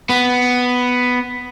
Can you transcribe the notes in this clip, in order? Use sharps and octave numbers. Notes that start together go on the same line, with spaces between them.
B3